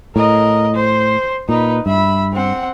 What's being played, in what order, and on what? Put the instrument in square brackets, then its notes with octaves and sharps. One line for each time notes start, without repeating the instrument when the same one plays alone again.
[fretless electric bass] A2 [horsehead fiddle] A#4 D#5
[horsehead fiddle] C5
[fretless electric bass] A#2 [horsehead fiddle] D#4 B4
[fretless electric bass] G2 [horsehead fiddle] E5 B5
[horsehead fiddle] C4 F#5